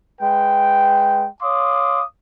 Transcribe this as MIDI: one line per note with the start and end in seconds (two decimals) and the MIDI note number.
0.21 1.26 56
0.21 1.26 71
0.21 1.26 79
1.42 2.02 73
1.42 2.02 77
1.42 2.02 84
1.42 2.02 86
1.42 2.02 87